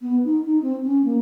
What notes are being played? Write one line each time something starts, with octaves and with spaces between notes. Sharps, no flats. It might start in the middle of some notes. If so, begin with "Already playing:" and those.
B3
D#4
D#4
C4
C#4
A#3